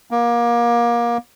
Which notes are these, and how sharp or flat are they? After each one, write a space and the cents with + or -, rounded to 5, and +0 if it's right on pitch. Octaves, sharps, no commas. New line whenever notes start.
A#3 +25